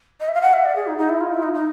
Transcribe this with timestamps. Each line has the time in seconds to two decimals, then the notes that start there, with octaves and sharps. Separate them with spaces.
0.20 D#5
0.28 E5
0.34 F5
0.42 F#5
0.53 E5
0.65 D5
0.75 G#4
0.87 D#4
0.98 D#4
1.09 E4
1.20 F4
1.33 E4
1.42 D#4
1.54 D#4